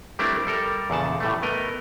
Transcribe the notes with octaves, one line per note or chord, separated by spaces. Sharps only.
G3 A3 C4 D4 E4 A#4
G3 A4 A#4
E2 A#2 C#3 F#5 A5
A2 G3 A3
A3 B3 A#4 D#5